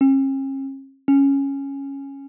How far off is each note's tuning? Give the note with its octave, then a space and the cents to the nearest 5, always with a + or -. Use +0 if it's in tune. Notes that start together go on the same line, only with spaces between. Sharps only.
C#4 -45
C#4 -5